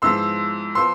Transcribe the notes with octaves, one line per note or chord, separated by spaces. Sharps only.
G#2 F3 B3 E4 C6 E6
F3 B3 C6 E6